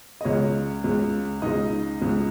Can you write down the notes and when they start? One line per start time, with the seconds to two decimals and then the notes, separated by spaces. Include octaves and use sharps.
0.21 D#5
0.25 C#2 C#3 C#5
0.84 C#2 C#3
1.42 C#2 C#3 D#4 D#5
2.02 C#2 C#3